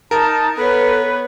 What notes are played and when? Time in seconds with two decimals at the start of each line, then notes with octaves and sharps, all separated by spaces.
0.11 D#4 A#4 A5
0.57 B3 A4 B4 C#5